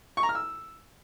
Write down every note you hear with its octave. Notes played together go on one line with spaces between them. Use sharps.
C#6
A#5
F6
E6